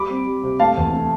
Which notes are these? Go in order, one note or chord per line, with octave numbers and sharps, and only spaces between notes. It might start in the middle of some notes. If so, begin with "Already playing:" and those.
Already playing: G3 B5 D6
C4
G3
C3
A3 F5 A5
E2
A3